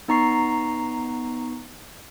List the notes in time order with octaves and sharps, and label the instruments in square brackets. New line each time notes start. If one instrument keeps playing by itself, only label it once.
[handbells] B3 D#4 A#5 C#6 C7